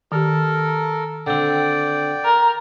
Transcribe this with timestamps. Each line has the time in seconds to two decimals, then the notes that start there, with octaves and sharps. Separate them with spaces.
0.12 D#3 G4 A4 A#4
1.27 D3 C4 D5 G5
2.25 A#4